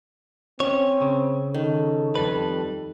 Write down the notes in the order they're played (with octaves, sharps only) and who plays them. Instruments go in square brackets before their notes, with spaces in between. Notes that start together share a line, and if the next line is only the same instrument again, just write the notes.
[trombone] C4 [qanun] C#4 [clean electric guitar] C#5
[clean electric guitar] C#3
[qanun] D#3 [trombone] A4
[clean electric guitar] F2 G3 B4